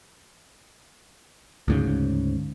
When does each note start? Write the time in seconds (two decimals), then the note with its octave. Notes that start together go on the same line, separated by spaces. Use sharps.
1.68 D2 G#2 C#3